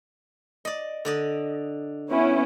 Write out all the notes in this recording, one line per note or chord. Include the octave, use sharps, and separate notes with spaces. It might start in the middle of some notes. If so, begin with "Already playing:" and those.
D5 D#5
D3 D5 D#5
B3 C#4 E4